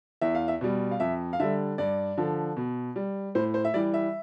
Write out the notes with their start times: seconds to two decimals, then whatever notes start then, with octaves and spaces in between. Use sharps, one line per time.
0.21 E2 E5
0.35 F5
0.48 E5
0.61 B2 G3
0.91 F5
1.00 F2 E5
1.33 F5
1.40 D3 G3 E5
1.78 G2 D5
2.17 D3 F3
2.57 B2
2.96 G3
3.35 A2 C5
3.54 C5
3.65 E5
3.74 E3 G3 D5
3.94 E5